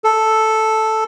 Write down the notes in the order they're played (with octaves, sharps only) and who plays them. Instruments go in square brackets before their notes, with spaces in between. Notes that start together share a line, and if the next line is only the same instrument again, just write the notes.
[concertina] A4